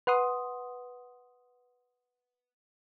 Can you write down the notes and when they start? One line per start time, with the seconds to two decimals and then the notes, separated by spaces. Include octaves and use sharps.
0.07 B4 F#5 C6 D#6